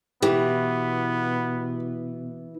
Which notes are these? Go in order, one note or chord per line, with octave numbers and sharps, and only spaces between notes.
B2 E3 B3 G4